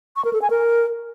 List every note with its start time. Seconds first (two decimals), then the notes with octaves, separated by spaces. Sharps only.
0.16 C#6
0.25 A#4
0.33 A4
0.42 G#5
0.50 A#4